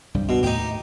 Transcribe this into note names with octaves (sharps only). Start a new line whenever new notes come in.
C2 G2 G3
B2
D#2 A2 D#4 G4